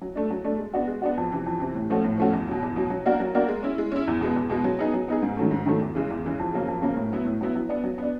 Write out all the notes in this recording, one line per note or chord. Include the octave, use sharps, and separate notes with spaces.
F#3
A3 D4
F#3
A3 D4
G#3
B3 D4 F#4
G#3
B3 D4 F#4
F2
C3 E3
F2
C3 E3
A2
F3 A3 C#4 F#4
A2
F3 A3 C#4 F#4
E2
B2 F#3
E2
B2 F#3
F#3
A#3 D4 F#4 A#4
F#3
A#3 D4 F#4 A#4
G#3
C#4 E4
G#3
C#4 E4
E2
B2 G#3 B3
E2
B2 G#3 B3
F#3
B3 D#4 G#4
F#3
B3 D#4 G#4
G#2
D#3 F#3 A3
G#2
D#3 F#3 A3
E2
C#3 E3 G#3
E2
C#3 E3 G#3
F2
C#3 F#3 A#3 C#4
F2
C#3 F#3 A#3 C#4
A2
F#3 B3 E4
A2
F#3 B3 E4
F#3
B3 D4
F#3
B3 D4